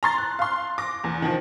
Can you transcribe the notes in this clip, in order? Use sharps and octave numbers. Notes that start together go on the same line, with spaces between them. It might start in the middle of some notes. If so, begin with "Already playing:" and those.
A#5 C6 A6
F#6
F5 C6
D6 A#6
E2
D#3 F3